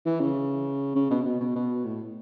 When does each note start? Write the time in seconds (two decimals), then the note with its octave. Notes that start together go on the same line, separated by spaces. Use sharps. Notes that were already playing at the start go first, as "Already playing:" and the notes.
0.06 E3
0.21 C#3
0.95 C#3
1.10 B2
1.21 C#3
1.25 B2
1.40 B2
1.55 B2
1.85 A2